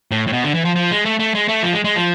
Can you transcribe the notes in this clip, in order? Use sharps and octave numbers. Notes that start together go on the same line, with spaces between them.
A2
A2
B2
D3
E3
F3
F3
G#3
A3
A3
G#3
A3
F3
G#3
G#3
F3